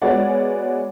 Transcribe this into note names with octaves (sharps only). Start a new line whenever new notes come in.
G#3 B3 F#4 C#5 D5 F#5